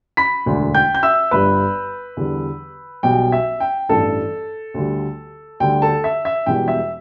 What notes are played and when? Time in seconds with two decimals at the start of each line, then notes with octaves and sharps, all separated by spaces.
0.17 B5 B6
0.46 E1 D2 D3
0.74 G5 G6
0.95 G6
1.03 E5 E6
1.31 G1 G2 G3 B4 B5
2.17 E2 D3 G3
3.03 B1 B2 G3 G5
3.32 E5
3.60 G5
3.89 A1 G2 E3 A4 A5
4.74 D2 D3 G3
5.60 D2 D3 G3 G5
5.82 A4 A5
6.04 E5
6.25 E5
6.46 E1 E2 B2 G3 G5
6.68 E5